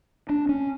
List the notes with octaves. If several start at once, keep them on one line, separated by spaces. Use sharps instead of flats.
D4
C#4